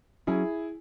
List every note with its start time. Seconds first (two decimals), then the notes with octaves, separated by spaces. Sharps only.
0.27 F#3 C#4 E4 G#4